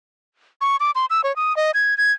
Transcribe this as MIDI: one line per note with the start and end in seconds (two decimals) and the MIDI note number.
0.61 0.76 85
0.80 0.91 86
0.95 1.06 84
1.10 1.21 88
1.24 1.35 73
1.36 1.55 87
1.57 1.71 75
1.74 1.97 92
1.98 2.12 92